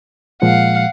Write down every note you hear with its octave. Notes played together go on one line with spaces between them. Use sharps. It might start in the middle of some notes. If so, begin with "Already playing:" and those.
A#2 F3 G#3 F5 F#5